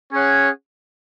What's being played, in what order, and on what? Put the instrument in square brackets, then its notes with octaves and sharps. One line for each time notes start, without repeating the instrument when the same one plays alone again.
[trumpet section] C#4 G#4 C#5 F#5